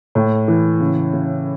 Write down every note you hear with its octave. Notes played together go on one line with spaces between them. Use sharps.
A2
E3
C#3
C#3